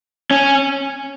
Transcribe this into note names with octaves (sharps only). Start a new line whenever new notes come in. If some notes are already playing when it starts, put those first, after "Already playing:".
C#4